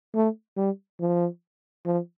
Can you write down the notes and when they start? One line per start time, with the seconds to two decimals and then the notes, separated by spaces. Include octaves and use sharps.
0.15 A3
0.57 G3
1.00 F3
1.85 F3